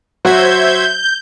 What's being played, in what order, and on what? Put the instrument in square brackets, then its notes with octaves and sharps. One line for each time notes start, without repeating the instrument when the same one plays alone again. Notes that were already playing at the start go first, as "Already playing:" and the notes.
[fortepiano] F#3 F#4 F#5 [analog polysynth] C5 E5 G#6 [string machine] G6